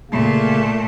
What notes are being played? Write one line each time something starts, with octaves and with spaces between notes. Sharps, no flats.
A#2 C#3 A3 A#3